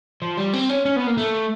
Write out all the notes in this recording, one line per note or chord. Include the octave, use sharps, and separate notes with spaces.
F3
G3
C4
C#4
C#4
B3
A#3
A3